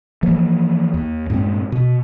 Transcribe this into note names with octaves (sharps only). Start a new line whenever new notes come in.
E3 F3 A#3
D#2
G2 A#2 G#3 C4
B2